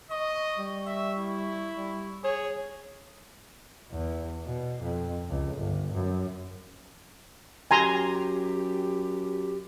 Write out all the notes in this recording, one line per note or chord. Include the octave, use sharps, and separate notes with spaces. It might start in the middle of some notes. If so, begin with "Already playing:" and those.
D#5 C#6
G3
E5 C#6
E4
G3
G#4 C#5
E2
B2
F2
C#2
G1
F#2
F#2 G4 G#5 A#5 C6